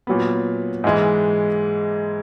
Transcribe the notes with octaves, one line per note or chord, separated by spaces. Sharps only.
A#2 F#3 B3
G#2 E3 G#3